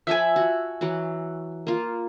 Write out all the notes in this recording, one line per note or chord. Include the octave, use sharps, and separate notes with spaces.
F3 E5 G#5 A5 B5
F#4
E3 F#3 F#4
A#3 F4